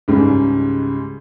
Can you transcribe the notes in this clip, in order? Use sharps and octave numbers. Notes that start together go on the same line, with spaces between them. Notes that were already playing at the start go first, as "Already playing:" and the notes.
C#2 G#2 C#3 G3